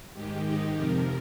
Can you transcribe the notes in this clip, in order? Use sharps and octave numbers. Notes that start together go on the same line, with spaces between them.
G#2 D#3 G#3 G4
D#4
F2 C3 F3 A#4